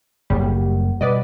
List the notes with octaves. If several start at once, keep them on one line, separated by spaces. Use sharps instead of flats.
F#1 A2 C#3 G3 A#3
B2 G3 B4 D5 D#5